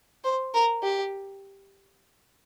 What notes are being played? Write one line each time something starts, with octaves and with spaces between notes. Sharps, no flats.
C5
A#4
G4